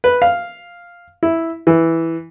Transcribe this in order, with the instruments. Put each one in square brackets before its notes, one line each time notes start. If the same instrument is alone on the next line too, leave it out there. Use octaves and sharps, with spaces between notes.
[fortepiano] B4
F5
E4
E3